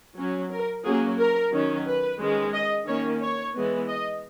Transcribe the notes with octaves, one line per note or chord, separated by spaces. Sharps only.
F#3 C#4
A#4
F#3 A#3 C#4 G#4
A#4
D#3 F#3 C#4
B4
D#3 G#3 C#4
D#5
D#3 A#3 C#4 C#5
C#5
E3 G#3 B3
D#5